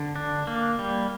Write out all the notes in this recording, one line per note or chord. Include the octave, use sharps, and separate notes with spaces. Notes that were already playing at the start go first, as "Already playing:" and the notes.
Already playing: D3
D4
A#3
G3